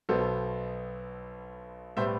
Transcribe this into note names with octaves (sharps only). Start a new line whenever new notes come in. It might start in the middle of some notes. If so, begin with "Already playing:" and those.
B1 B2 B3 A4 C5
A2 G3 B3 C5 E5